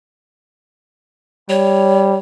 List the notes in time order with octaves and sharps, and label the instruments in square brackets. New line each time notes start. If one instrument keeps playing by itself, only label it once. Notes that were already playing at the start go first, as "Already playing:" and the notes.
[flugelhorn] G3 [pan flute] C#5